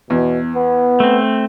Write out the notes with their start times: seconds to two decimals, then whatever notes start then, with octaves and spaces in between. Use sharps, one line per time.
0.10 E2 B2
0.55 B3
1.00 A3 C4